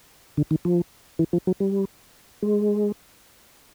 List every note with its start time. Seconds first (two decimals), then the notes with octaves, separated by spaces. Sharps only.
0.37 D3
0.51 D#3
0.65 F3
1.19 E3
1.33 F3
1.47 F#3
1.60 G3
2.43 G#3